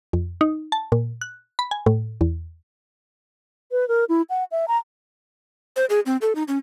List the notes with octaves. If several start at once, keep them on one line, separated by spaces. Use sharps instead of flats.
F2
D#4
A5
A#2
F#6
B5
G#5
A2
E2
B4
A#4
E4
F#5
E5
A#5
C5
G#4
C4
A4
D#4
C#4